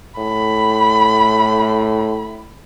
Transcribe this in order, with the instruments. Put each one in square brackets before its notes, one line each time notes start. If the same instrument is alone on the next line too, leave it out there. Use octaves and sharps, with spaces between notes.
[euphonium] A2 [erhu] B5